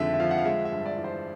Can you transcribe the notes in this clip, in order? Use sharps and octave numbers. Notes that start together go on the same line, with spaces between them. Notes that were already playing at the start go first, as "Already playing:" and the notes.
Already playing: F2 D3 D#3 G#3 E5
E5
F3 F5
F#5
F5
G#3 E5
E5
G2
D5
E3
C5